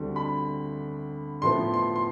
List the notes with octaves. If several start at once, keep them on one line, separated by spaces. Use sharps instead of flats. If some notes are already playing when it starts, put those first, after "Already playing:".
Already playing: D2 D3 G3 C4
B5
A2 F3 B3 C6
C6
C6